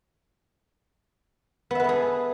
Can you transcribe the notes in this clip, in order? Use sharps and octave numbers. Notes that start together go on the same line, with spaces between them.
B3 G#4 A4 B4 E5